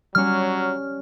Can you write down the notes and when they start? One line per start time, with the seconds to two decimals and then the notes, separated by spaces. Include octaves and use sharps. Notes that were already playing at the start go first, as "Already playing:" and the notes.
0.15 F#3 G3 C#4 F6